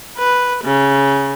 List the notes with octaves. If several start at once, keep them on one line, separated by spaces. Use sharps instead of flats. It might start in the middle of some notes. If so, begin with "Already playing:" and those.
B4
C#3